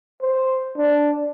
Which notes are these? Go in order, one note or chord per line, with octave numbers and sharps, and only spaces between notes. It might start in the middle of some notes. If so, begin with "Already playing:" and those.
C5
D4